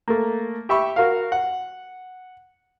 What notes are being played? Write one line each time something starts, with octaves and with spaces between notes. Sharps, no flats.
A3 A#3
G4 E5 B5 C#6
F#4 A#4 F5
F#5